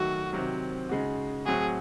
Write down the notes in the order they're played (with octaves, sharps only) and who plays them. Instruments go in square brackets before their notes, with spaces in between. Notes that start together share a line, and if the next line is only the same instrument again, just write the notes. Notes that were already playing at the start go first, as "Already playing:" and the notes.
Already playing: [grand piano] D#3 F#3 A3 [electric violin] F#4
[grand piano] C3 D#3 F#3 C4
C#3 G#3 D#4 F#4
[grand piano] A2 F#3 C4 F#4 [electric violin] G#4